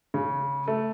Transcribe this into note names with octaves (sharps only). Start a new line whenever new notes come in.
C#3
A3